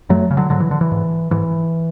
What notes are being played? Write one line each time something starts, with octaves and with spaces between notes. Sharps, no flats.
F#2 F#3 A3
C#3
D3 F#3
G#2 D3 F#3
E3
D3
E3
G#2
G#2 E3